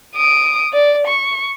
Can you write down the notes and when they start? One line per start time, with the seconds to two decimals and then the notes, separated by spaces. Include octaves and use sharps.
0.16 D#6 D7
0.73 D5
1.07 C#6